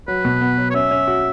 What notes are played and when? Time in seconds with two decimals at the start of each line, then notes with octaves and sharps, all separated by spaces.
0.08 F#3 B4
0.25 B2
0.41 B3
0.58 F#3
0.70 C#5
0.74 C#4 E5
0.91 C#4
1.07 F#4